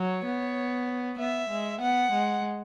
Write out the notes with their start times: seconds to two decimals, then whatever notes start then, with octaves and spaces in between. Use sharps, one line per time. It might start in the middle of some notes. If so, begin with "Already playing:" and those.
Already playing: F#3 C#5
0.25 B3
1.19 B3 E5
1.49 G#3
1.81 B3 F#5
2.12 G#3